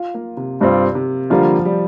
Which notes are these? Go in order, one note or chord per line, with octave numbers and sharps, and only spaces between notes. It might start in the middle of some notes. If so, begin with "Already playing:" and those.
Already playing: F4
A#3
C3
G2 C3 G3 C4 F4
C3
D3 F3 G3 A#3 F4
G3